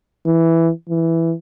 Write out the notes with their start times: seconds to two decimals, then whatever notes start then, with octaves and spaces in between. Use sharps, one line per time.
0.26 E3
0.89 E3